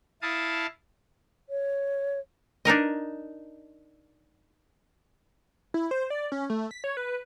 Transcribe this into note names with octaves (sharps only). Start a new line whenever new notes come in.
E4 F5 A5 D#6
C#5
D4 D#4 A#4 D#5
E4
C5
D5
C#4
A3
B6
C#5
B4